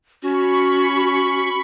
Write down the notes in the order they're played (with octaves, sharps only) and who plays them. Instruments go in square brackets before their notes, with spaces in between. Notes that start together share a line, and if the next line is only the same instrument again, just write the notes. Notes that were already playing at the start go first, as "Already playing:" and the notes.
[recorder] C#4 [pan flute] F#4 [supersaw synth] B5 C#6